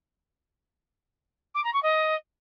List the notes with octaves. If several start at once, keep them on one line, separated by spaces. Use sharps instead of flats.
D6
A#5
C#6
D#5